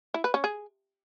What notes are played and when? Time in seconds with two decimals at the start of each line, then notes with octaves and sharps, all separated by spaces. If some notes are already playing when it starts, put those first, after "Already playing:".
0.14 E4
0.24 B4
0.34 C#4
0.44 G#4